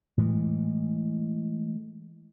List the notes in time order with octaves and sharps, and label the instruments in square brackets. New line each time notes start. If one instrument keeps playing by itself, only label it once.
[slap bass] A2 E3 G#3